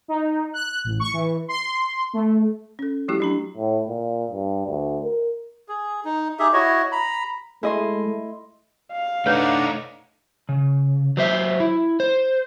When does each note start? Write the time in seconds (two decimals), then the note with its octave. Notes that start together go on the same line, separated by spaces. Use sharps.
0.08 D#4
0.54 F#6
0.84 A1
1.00 C#6
1.13 E3
1.48 C6
2.13 A3
2.79 C#4 A4
3.08 F3 G3 A3 E4 F#4 G4
3.20 F#3 D4 A#5
3.57 A2
3.89 A#2
4.31 G2
4.67 D2
5.04 A#4
5.69 G#4
6.05 D#4
6.39 D#4 G4 G#4 E5
6.53 E4 F#4 C#5 D#5
6.92 A#5 B5
7.63 G#3 A3 E4 D#5 C6
8.92 F5
9.26 A3 D4 D#4 B4 C#5 F#5
10.49 C#3
11.17 F#3 C5 E5
11.60 E4
12.00 C5